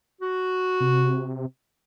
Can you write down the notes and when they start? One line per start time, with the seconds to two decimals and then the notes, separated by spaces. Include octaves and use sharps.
0.21 F#4
0.80 C3